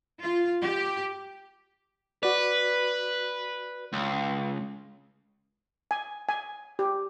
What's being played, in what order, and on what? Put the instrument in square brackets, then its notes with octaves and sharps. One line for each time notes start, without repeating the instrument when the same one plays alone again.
[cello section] F4
G4
[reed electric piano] F#4 D5 [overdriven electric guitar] B4
[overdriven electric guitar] C#2
[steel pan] G#5
G#5
G4